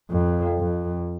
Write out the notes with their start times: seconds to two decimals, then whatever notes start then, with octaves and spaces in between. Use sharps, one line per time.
0.11 F2
0.58 F2